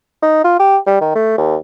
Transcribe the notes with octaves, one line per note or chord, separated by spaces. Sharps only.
D#4
F4
G4
G3
D#3
A3
D#2